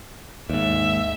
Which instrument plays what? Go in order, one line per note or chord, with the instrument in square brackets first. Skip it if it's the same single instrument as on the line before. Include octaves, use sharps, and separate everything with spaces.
[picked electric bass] D#2 G#2 [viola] E5